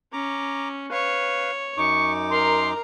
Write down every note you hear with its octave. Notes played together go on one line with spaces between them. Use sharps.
C#4 A#5 D6
B4 C#5 F5
F#2 D#4 C#6 D6
A#4 A#5 C6